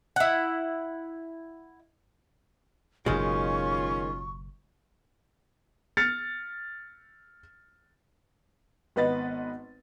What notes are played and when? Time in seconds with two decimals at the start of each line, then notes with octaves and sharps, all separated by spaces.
0.16 E4 F#5
3.06 F#1 B2 D#3 G#3 C#4 F4 C#6
5.97 F6 A6 C#7
8.96 G#1 B3 B4 D#5 A6